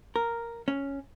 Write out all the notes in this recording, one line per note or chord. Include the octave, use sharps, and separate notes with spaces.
A#4
C#4